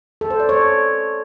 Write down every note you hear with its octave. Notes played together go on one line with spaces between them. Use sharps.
A4
C5
D5
C#5